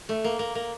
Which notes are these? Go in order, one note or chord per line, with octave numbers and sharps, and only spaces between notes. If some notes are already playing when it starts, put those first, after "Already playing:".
A3
A#3
A#3
A#3